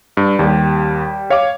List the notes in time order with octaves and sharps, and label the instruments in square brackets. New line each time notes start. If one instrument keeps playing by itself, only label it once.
[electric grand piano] G2
[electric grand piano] D#2 [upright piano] G3 G4
[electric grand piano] C#5 [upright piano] F5 D6